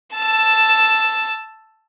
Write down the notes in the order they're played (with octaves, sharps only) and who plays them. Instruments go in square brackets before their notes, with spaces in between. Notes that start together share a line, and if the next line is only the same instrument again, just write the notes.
[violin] A5 E6